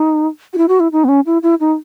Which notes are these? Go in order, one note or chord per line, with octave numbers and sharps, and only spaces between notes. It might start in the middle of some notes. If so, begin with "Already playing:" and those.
Already playing: D#4
F#4
E4
F#4
E4
D#4
B3
C#4
E4
E4
D#4